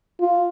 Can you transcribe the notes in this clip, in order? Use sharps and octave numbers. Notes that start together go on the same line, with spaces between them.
F4